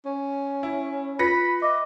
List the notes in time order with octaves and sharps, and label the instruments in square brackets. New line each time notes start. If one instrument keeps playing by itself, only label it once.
[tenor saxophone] C#4
[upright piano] E4
[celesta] F4 C#7 [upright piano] B4 A#6 [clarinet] B5
[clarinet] D#5 [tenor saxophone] E5 [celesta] D6